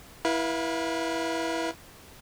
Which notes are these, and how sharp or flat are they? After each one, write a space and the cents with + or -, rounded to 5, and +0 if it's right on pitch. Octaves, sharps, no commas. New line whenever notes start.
E4 +0 B4 -35 F5 +20